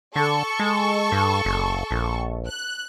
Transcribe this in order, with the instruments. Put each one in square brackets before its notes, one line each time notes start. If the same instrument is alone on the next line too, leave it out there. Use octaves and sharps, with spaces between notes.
[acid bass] D3 [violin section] A4 C#6
[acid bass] G#3
G2
F#1
A#1
[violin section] F#6